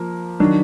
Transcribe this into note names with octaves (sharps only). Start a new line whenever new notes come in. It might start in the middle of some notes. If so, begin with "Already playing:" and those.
Already playing: F3 A#3 A#4
D#3 F#3 D4